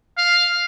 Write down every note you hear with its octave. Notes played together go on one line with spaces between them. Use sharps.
F5